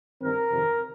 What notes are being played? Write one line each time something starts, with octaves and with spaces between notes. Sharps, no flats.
G2 D#3 C4 A#4
F2 C3 D#3